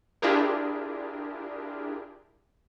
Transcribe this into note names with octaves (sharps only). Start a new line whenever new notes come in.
D4 E4 F4 G4 G#4 A#4